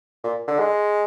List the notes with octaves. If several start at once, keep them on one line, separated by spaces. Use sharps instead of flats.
A#2
D3
G#3